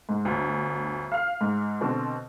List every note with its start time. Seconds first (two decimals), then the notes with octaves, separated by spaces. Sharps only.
0.09 G#2
0.25 G1 D2
1.12 F5 F6
1.41 G#2
1.81 B2 D3 C4 A4